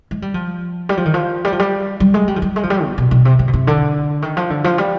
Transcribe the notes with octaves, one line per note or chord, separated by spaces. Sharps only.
G#3
G3
F3
G3
F3
D#3
F3
G3
F3
G3
G3
G#3
G3
F3
G3
G#3
F3
G3
B2
B2
B2
C3
D3
B2
C3
D3
D#3
F3
D3
F3
G3